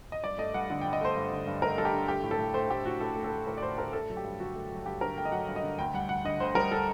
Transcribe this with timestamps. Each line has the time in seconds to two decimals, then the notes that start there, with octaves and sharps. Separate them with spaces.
0.12 D#5
0.24 G2 D5
0.38 A3 D#5
0.54 G2 F#5
0.70 D3 F#5
0.81 G5
0.86 G2
0.93 D#5
1.01 A3 C5
1.16 G2
1.32 D3
1.47 G2
1.62 A3 A#4
1.77 G2 A4
1.85 G4
1.93 D3
2.08 A3 G4
2.23 A2
2.31 A4
2.39 A2
2.54 A3 C5
2.70 A3 G4
2.85 A2 F#4
3.00 A2 A4
3.16 A3
3.24 A4
3.32 A3
3.47 A2 A#4
3.58 D5
3.62 A2 C5
3.78 A3 A#4
3.93 A3 A4
4.10 F#3
4.17 G4
4.24 G2
4.40 D3 F#4
4.55 A3
4.71 F#3
4.86 G2 G4
5.01 D3 A#4
5.17 A3 G5
5.25 D#5
5.32 F#3 F#5
5.48 G2
5.56 D#5
5.63 D3
5.79 D2 G5
5.94 G3 F#5
6.09 D2 F#5
6.24 D3 D#5
6.40 D2 C5
6.55 G3 A#4
6.72 A4